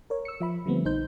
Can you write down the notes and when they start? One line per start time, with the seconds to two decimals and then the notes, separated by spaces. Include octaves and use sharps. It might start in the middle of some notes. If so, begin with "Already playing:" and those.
0.10 A#4 C#5
0.25 E6 C#7
0.40 F3 E5 B5
0.66 D3 F3 G3 A3 B3 C4
0.85 A#1 D#4 C5 G6